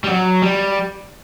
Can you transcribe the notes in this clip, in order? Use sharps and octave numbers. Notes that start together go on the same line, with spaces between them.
G3
F#3
G3